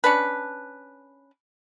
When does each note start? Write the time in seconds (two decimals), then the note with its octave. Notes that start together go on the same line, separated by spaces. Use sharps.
0.04 C#4 D4 B4